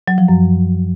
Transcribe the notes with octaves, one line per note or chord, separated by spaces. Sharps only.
F#3
F3
F#2